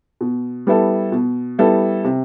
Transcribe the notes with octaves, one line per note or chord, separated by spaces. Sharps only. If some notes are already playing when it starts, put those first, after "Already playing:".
B2
G3 B3 E4 A4
B2
G3 B3 E4 A4
C3